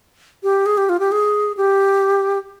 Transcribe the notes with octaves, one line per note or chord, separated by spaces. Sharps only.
G4
G#4
G4
F4
G4
G#4
G4